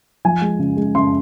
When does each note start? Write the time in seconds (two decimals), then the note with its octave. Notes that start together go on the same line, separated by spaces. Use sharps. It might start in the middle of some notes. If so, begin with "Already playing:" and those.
0.25 F3 G#5
0.42 G#3
0.59 C#3
0.77 G#3
0.95 C#3 C6